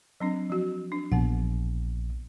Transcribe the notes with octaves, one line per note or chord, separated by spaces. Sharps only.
F#3 C4 D4
F3 F#4
D4
A#1 B3 F#5